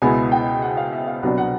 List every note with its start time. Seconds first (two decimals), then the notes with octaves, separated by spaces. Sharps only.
0.02 C#2 B2 G#3 B3 E4 G#5
0.32 G5
0.62 F#5
0.77 F5
0.92 E5
1.07 F5
1.23 C2 B2 F#3 B3 D4 F#5
1.38 F#5